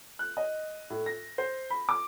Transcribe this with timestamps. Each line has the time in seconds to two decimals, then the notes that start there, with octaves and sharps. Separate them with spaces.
0.19 F#6
0.37 D#5
0.90 A2
1.06 A#6
1.38 C5
1.70 B5
1.89 D6